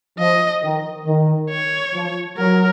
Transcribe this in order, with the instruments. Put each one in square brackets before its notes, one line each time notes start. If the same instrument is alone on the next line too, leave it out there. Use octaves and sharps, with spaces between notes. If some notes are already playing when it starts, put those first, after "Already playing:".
[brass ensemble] F3 [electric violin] D#5
[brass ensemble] D#3
D#3
[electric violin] C#5
[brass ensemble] F3
[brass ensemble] F#3 [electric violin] A#4